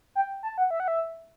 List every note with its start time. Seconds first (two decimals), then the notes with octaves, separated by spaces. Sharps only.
0.15 G5
0.43 A5
0.58 F#5
0.71 E5
0.80 F#5
0.88 E5